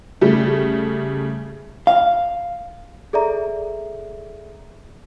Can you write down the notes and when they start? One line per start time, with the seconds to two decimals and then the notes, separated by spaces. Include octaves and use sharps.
0.21 C#3 G3 A3
1.87 F5
3.13 G#4 A4 D5 E5 A#5